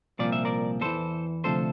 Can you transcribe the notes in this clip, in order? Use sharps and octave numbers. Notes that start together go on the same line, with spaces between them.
C2 A#2 F3 D5
E5
A#4 D5
E2 E3 A4 C5
D2 C3 F3 A4 C5